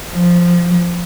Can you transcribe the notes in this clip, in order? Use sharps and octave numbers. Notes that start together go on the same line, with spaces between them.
F3